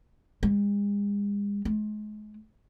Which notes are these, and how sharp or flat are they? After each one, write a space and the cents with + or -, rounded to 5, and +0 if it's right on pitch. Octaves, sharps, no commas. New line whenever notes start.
G#3 -40
G#3 +35